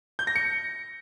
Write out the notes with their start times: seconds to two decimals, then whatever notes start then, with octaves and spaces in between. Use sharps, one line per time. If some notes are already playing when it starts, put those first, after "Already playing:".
0.19 G6
0.27 A#6
0.36 C#7